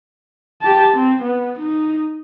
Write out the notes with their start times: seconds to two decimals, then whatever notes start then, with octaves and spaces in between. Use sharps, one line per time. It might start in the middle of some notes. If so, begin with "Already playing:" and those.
0.61 G4 A5
0.93 C4
1.22 B3
1.59 D#4